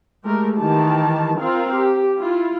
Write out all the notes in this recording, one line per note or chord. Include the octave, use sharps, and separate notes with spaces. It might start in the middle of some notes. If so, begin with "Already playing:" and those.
G#3 A3 G4 A#4
D#3 E3 G4 A5
C4 F4 A#4 F5
G4
E4 F4